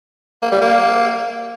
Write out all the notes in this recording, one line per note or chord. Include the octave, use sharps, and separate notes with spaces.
A#3
G3
A#3